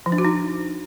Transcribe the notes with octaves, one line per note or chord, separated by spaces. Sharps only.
F3
D4
F#4
D#4